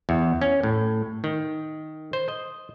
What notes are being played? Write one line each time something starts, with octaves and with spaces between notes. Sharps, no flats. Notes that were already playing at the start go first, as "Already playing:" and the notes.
E2
C#4
A2
D#3
C5
D#5